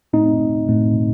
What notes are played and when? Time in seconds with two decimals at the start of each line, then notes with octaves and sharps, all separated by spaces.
0.13 A2 A3 C4 D#4
0.68 A2 A3 C4